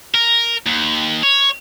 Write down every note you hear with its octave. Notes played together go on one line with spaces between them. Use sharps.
A#4
D#2
C#5